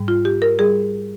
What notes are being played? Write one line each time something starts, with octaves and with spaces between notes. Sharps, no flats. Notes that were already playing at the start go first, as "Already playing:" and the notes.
Already playing: G#2 G3
F4
G4
A#4
G3 G#4